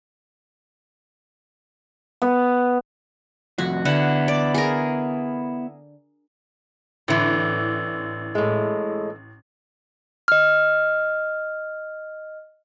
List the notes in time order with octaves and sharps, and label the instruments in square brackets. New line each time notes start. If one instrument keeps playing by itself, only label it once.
[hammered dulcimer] B3
[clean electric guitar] C2 F2 [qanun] F#4
[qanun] D3 F#5 [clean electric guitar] B3 E4
[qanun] D5
G#4 A#4
[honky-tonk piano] A1 [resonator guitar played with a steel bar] D3 E3
[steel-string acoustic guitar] A2 G#3
[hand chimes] D#5 F6